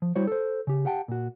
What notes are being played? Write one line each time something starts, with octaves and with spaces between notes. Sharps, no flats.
F3
G3 E4 F#4 C5 C#5
A4 C5
C#3 G4
G4 F#5 G5 A5
A#2 F#4